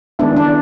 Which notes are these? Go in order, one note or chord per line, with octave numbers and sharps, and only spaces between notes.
D#3 G#3 B3 D4 E4
D4